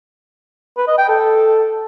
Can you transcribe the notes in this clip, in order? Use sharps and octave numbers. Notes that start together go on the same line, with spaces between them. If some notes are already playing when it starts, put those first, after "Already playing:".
B4
D#5
G5
A4